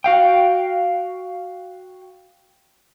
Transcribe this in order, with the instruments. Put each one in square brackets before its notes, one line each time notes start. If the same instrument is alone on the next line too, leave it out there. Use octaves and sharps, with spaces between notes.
[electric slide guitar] F#4 F5 G5